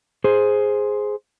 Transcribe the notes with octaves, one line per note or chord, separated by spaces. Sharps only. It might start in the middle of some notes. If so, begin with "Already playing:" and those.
G#4 C5